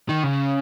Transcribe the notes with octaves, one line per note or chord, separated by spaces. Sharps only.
D#3
C#3